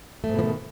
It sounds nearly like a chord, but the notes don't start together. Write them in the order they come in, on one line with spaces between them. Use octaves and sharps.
A3 G#2 B2 F3 D#3